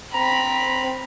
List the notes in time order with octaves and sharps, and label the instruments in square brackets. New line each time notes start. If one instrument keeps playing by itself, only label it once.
[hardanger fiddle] C4 B5 [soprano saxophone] A#5